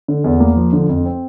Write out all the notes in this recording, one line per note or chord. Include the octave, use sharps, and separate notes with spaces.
D3
E2
A#3
F3
D3
F2
C4